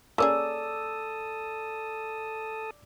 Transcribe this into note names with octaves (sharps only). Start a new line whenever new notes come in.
A#3 C#4 G#4 A4 D5 A5 D#6 E6